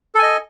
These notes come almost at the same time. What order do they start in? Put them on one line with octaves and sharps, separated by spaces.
A4 G#5 D#5